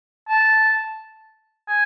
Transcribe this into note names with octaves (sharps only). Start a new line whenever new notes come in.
A5
G#5